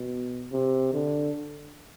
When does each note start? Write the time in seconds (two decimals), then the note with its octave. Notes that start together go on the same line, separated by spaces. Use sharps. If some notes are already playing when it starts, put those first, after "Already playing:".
Already playing: B2
0.52 C3
0.93 D3